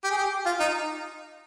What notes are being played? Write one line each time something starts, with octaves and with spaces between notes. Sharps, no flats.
G4
G#4
G4
F4
D#4